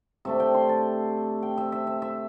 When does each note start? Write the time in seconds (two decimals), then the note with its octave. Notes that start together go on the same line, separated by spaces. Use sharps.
0.25 C3 A3 D4 E5
0.40 G5
0.54 C6
0.69 A5
1.43 G5
1.58 E5
1.72 E5
1.87 E5
2.02 E5